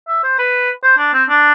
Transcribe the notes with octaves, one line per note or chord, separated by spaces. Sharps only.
E5
C5
B4
C5
D4
C4
D4